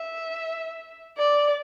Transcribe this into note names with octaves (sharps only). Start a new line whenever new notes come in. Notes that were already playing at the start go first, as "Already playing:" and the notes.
Already playing: E5
D5